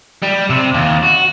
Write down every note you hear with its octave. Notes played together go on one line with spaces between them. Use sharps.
G3
C3
D#2
F#4